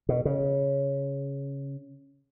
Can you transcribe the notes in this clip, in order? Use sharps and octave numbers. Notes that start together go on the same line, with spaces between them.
B2
C#3